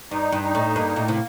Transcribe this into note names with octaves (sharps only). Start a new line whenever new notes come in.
G2 D#4
G2
D#4
A2
G2 A#3
A2
C3